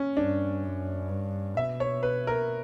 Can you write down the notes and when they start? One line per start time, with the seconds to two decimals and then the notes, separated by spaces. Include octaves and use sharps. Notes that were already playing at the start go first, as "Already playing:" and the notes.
Already playing: C#4
0.16 G2 D4
0.63 F#2
1.09 G2
1.56 B2 E5
1.80 C#5
2.03 B4
2.27 A#4